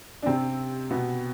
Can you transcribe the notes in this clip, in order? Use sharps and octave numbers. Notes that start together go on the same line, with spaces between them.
D4
C3 C4
B2 B3